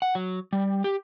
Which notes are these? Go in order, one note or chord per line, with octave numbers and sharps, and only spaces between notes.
F#5
F#3
G3
G4